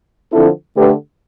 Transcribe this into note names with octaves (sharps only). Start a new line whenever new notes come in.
D3 F3 C4 E4 A4
D3 A3 D4 G4 B4